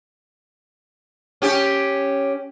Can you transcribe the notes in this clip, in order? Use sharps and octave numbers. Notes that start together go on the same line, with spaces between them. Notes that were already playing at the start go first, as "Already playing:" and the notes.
C#4 G4